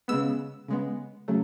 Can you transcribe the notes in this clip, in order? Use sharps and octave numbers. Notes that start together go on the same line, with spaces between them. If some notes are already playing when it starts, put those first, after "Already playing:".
C#3 G#3 B3 E6
C#3 G#3 B3
C#3 F#3 A3